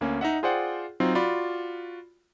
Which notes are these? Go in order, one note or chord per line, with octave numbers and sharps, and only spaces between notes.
D2 A#3 C#4
D#4 D#5 E5 F#5
F4 G#4 C5 D5 F#5 G5
F#3 C4 D#4 F4
F4 F#4 D5 B5